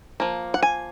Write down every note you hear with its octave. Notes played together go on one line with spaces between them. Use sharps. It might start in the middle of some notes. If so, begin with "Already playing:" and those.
F3 A#3
F#5
G#5